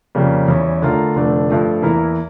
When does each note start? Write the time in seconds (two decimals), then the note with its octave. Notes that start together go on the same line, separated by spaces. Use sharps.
0.15 F2 C#3 G3 A#3
0.48 E2 E3 G3 C#4 G4
0.82 D3 A3 D4 F4 A#4
1.16 F1 F2 D3 A3 D4
1.49 G2 F3 A3
1.82 E2 E3 A#3 E4 A#4